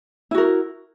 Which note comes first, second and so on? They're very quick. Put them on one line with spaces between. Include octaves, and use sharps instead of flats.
E4 F#4 A#4